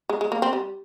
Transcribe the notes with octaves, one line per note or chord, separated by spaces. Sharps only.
G#3
G#3
A#3
C4
G3